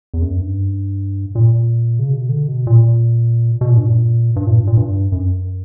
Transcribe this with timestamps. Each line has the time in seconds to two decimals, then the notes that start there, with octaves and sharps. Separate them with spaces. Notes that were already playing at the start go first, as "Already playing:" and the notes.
0.14 E2
0.22 F#2
0.41 G2
1.35 A#2
1.99 C#3
2.10 B2
2.29 D3
2.48 B2
2.67 A#2
3.61 B2
3.69 A#2
3.77 G2
3.85 A#2
4.36 G2
4.47 A#2
4.57 G2
4.67 A#2
4.77 G2
5.12 F#2